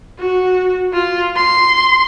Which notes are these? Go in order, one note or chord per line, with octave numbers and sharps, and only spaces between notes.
F#4
F4
C6